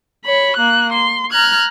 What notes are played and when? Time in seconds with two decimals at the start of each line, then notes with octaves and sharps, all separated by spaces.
0.25 C#5 B5
0.57 A#3 F#6
0.92 C6
1.30 A#5 F6 F#6 G#6